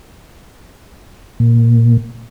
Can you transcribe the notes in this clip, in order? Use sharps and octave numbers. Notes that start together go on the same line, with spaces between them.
A#2